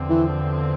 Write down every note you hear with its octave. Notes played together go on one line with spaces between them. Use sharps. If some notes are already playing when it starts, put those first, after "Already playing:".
Already playing: E2 D3 F3 C4
E3